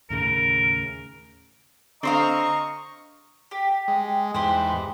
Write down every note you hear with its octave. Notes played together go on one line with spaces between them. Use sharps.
D#2 A2 C#3 A#4
D3 C4 C5 D#5 F5 A#5 C#6
G4
G#3
E2 G#2 G4 B4 C5